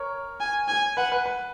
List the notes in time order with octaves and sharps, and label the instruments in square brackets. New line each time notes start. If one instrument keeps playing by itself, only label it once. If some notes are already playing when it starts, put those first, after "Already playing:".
Already playing: [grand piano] A#4 C#5
[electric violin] G#5
G#5
[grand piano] B4 [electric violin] F#5
[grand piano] B4
B4